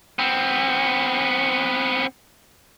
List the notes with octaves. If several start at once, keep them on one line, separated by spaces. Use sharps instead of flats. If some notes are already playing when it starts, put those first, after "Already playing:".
B3 C4